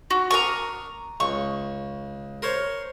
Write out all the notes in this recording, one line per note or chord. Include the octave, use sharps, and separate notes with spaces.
F#4
D4 A#4 A#5 C#6 D#6
C#2 C#6
A#4 C5 C#5